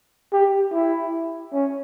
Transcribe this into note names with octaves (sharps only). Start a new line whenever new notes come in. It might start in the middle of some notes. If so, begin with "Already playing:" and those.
G4
E4
C#4